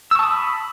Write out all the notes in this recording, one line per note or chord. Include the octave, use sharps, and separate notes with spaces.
A5 B5 C#6 D#6 E6